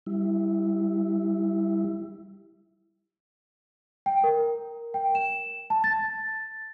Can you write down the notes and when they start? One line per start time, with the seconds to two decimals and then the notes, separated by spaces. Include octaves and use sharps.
0.06 G3 E4
4.06 G5
4.24 A#4
4.94 G5
5.15 E7
5.70 A5
5.84 A6